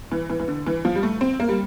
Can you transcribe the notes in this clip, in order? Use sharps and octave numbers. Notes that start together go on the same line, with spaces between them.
E3
E3
E3
D3
E3
F3
G3
A3
C4
A#3
G3